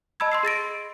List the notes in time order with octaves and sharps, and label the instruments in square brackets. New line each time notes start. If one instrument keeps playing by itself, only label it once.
[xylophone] D#5 A5 B5 E6 G#6
C6 E6 C7
G#4 A6 A#6 D7